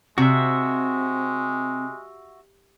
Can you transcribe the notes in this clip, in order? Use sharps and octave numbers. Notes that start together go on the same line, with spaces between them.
C3 G#3 C4 F#4 E5